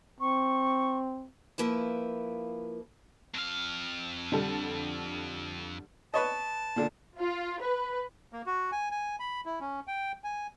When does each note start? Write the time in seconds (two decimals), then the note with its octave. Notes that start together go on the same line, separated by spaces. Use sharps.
0.20 C4 C#6
1.58 F3 A#3 E4 B4
3.35 F2 F5
4.32 D3 G3 A4
6.14 B4 C#5 D#5 A5
6.76 A#2 D3
7.18 F4
7.62 B4
8.33 A#3
8.46 F#4
8.72 G#5
8.91 G#5
9.20 B5
9.45 E4
9.60 C#4
9.88 G5
10.24 G#5